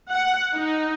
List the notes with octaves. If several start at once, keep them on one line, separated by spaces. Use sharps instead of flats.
F#5
D#4